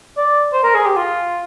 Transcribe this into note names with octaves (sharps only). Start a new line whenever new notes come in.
D5
C5
A#4
G#4
G4
F4